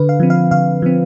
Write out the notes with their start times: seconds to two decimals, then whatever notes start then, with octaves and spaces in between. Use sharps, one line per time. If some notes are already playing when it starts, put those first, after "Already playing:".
Already playing: D3 B4
0.09 F5
0.20 F3 C4
0.30 F5
0.51 D3 F5
0.82 F3 C4